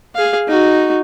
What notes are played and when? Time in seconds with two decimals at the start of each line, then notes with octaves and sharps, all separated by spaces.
0.15 G#4 F5
0.48 D#4 F#4